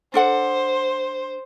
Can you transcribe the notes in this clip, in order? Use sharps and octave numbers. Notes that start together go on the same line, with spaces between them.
D4 A4 C5 F#5